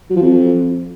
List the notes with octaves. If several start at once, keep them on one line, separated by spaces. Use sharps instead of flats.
F#3
F3
F2